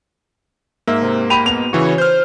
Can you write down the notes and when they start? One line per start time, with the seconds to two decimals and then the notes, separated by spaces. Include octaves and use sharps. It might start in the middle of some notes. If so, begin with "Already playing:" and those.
0.87 G#2 A#3 E5
1.02 C3
1.30 G4 B5 D#7 F7
1.46 B2 F7
1.73 C#3 E3 F#4 C#5
1.98 C5 F6 G6